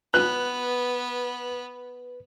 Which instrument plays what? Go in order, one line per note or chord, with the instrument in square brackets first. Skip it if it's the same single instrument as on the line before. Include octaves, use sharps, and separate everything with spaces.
[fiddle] B3 [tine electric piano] B4 [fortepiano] F#6